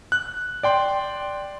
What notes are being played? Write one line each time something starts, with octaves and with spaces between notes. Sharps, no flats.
F#6
D5 G5 C6